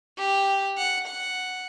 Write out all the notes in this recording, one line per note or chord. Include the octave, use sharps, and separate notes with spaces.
G4
F#5
F#5